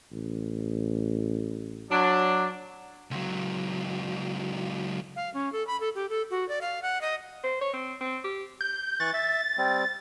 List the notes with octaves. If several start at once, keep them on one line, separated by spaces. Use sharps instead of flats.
A1
F#3 D4
C#2 F#3
F5
C#4
A4
B5
A4
G4
A4
F#4
D5
F5
F#5
D#5
C5
C#5
C4
C4
G4
G6
E3 C#6 F#6 A6
E5
G3 C4